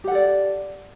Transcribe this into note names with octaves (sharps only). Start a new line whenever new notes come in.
G4 A4 D5 F#5